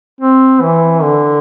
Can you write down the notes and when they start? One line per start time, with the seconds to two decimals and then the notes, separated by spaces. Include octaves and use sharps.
0.21 C4
0.62 E3
1.03 D3